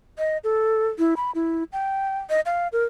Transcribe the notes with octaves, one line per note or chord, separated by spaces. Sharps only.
D#5
A4
E4
B5
E4
G5
D#5
F5
A#4